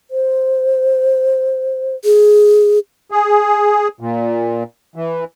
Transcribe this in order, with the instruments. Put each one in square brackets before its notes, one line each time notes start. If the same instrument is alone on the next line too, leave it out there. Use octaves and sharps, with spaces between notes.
[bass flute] C5
[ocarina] G#4
[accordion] G#4
A#2
E3